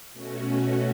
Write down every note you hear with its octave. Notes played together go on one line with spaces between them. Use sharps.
B2 A3 C#4 F#4